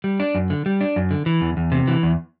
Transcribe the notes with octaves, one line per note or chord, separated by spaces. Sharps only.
G3
D4
F#2
D3
G3
D4
F#2
D3
E3
E2
E2
C3
E3
E2